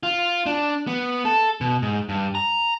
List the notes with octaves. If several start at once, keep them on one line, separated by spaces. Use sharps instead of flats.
F4
D4
B3
A4
B2
G#2
G2
A#5